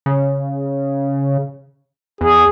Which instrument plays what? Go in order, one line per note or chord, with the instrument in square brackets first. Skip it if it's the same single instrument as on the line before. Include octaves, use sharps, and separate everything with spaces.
[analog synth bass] C#3
[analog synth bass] E2 [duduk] G#4